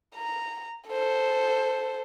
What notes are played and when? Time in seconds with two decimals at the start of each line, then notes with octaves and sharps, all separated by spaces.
0.16 A#5
0.89 A4 C5